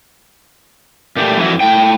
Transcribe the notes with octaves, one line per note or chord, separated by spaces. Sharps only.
A#2 A3 G4
F2 E3 F#3 A3 E4 F#4
A2 G5